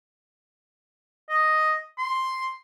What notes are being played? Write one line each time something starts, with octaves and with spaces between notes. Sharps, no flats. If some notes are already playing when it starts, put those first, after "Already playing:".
D#5
C6